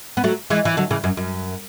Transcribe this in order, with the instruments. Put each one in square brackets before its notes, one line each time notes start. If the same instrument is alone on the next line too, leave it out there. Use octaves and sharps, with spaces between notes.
[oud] B3
F#3 A3
E3 G#3
E3
D3 F#3
C#3 E3
F#2
F#2